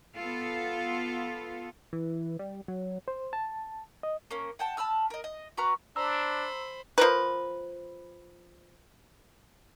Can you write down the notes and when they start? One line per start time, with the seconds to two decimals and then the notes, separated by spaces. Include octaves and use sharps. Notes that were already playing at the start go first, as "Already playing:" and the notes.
0.17 B3 F4 A4
1.93 E3
2.39 G3
2.68 F#3
3.08 C5
3.33 A5
4.03 D#5
4.31 A#3 C#4
4.59 F#5 G5 A5
4.77 A5 B5 E6 F6
5.10 A#4 D#5
5.24 D#5
5.57 F#4 B4 A#5 F6
5.96 D4 C5 A#5 B5 E6
6.98 F3 A#4 B4